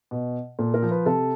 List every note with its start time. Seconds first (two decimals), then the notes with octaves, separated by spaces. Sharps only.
0.11 B2
0.59 A#2 A4
0.74 A#4
0.82 F3
0.91 B4
1.06 C3 A4